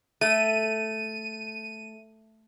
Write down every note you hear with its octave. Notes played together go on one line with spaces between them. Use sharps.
A3 D#7